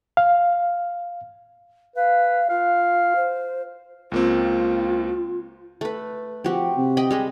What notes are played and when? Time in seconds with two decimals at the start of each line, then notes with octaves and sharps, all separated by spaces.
0.17 F5
1.96 B4 F5
2.49 F4 F5
3.16 C5
4.12 C#2 A#3 C4 F4
5.81 A3 B4
6.44 F3 C4 F#4 G4
6.77 C3
6.97 D#5 G5 B5
7.11 G3 G#3 D#5